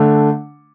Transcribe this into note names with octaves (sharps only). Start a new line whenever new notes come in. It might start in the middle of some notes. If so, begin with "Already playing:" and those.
Already playing: D3 A3 D4